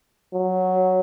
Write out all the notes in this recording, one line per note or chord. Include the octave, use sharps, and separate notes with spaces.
F#3